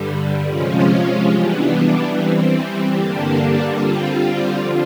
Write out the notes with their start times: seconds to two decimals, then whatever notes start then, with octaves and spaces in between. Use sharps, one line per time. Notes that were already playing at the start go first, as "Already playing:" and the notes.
Already playing: G2 D3 G3
0.48 C3 F3 G#3 C#4 F4
1.29 E3 G3 B3 D4
2.10 E3 G3 C4
2.92 G2 D3 G3 A#3 D4
3.72 D3 G3 C4 F4
4.54 D3 F3